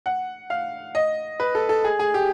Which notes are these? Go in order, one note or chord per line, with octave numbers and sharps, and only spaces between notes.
F#5
F5
D#5
B4
A4
A4
G#4
G#4
G4